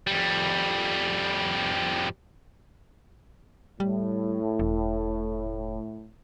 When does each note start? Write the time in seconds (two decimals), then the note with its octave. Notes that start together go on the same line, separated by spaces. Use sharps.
0.07 F2 G3
3.80 A2 G3
4.59 E1